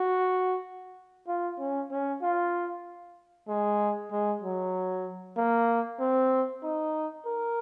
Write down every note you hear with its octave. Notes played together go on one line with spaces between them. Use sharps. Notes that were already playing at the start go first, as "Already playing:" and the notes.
Already playing: F#4
F4
C#4
C#4
F4
G#3
G#3
F#3
A#3
C4
D#4
A#4